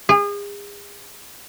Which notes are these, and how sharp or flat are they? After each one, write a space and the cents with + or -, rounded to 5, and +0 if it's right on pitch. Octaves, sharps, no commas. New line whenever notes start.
G#4 -35